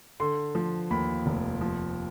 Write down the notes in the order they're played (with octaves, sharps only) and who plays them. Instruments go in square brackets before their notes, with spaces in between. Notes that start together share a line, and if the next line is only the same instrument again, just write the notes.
[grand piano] D3 C6
F3
D#2 B5
F1
F3